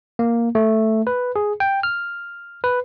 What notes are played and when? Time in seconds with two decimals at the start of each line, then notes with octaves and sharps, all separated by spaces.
0.19 A#3
0.55 A3
1.07 B4
1.36 G#4
1.60 G5
1.83 F6
2.64 B4